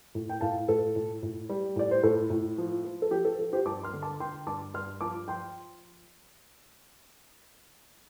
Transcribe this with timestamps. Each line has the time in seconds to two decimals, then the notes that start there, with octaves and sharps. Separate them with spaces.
0.15 A2
0.29 G5
0.41 A2 F5 A5
0.68 A2 A4
0.96 A2
1.23 A2
1.49 G3
1.76 A2 D5
1.91 C5
2.03 A2 A4
2.30 A2
2.58 F3
2.85 F3
3.02 A4
3.11 F3 G4
3.25 A4
3.38 F3 A4
3.53 G4 C5
3.65 G2 A5 D6
3.83 C6 F6
3.93 D3
4.02 A5 D6
4.20 D3 G5 C6
4.46 G2 A5 D6
4.74 G2 C6 F6
5.01 F3 A5 D6
5.28 F3 G5 C6